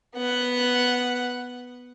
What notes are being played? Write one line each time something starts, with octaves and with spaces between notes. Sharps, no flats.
B3 F#5